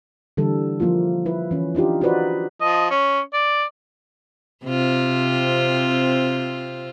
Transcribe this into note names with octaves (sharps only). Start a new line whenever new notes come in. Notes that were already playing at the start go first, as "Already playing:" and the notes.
D3 E3 G3 A4
F3 A#3 E4 F4
E4 B4
E3 C#4
D4 D#4 F4 G4
D#4 F4 F#4 B4 C5 D5
F3 D#5
C#4
D5
C3 C4 F4